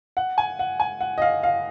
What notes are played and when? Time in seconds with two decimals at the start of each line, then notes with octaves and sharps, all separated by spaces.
0.17 F#5
0.38 G#5
0.59 F#5
0.80 G#5
1.01 F#5
1.18 D#5
1.22 F5
1.43 F5